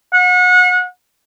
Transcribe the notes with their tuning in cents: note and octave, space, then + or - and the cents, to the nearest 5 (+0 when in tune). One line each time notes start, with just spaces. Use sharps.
F#5 -35